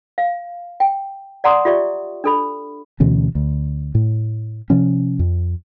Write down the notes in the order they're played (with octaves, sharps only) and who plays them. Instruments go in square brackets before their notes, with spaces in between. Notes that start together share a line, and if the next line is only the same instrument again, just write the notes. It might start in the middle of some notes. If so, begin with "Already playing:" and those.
[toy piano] F5
G5
D5 F#5 A#5 C6 D6 D#6
F4 G4 D5 E5 C#6
D4 A4 B5
[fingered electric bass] D2 B2 E3 C#4
D2
A2
C3 F3 C#4
F2